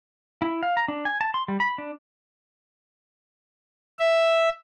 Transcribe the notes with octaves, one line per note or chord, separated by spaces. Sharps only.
E4
F5
A#5
D4
G#5
A5
C6
G3
B5
D4
E5